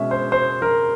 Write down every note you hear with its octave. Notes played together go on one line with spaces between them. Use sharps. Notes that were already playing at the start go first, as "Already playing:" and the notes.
Already playing: B2 G#3 C#4 E5
C5
C5
A#4